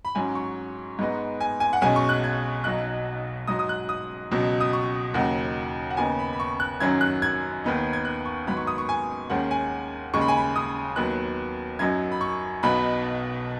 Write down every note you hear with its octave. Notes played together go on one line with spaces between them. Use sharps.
B5
G#2 F#3 C#4 G#5
C#6
G#2 G#3 B3 D#4
G#5
G#5
F#5
B1 B2 G#3 C#4 G#5
C#6
F#6
G#6
B1 B2 F#3 D#4 F#6
G#2 F#3 D#4 D#6
D#6
F#6
D#6
C#2 B2 F#3
D#6
C#6
D#2 C#3 F#3 D#4 F#5
F#5
D#2 C#3 B3 D#4 G#5
B5
B5
C#6
F#6
F#2 D#3 F#3 C#4 G#6
F#6
G#6
D#2 D#3 B3 D#4
G#6
F#6
C#6
G#2 D#3 F#3 B3 B5
C#6
D#6
C#6
G#5
D#2 D#3 G#3 C#4 F#5
G#5
D#2 C#3 G#3 C#6
B5
G#5
B5
D#6
D#2 D#3 F#3 B3 F#6
F#2 F#3 D#4 G#6
B5
C#6
B1 B2 B3 D#4 B5